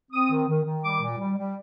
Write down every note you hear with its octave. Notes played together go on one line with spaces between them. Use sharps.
C4 D#6
D#3
D#3
D#3
G3 D6
A#2
G3
G3